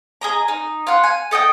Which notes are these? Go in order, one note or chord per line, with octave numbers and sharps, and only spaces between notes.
G#4 D#5 A#5
D#4
F4 F#5
G#5
A4 D#5 E5 G5